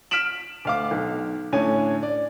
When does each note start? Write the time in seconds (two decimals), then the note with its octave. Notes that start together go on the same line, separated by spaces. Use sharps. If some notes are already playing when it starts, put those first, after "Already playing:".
0.11 F6 B6 D7 E7 F#7
0.65 D2 F5 D6
0.91 B1
1.53 A2 D3 C#4 G#5
2.03 D5